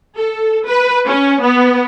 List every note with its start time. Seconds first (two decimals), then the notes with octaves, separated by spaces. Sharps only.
0.17 A4
0.67 B4
1.07 C#4
1.42 B3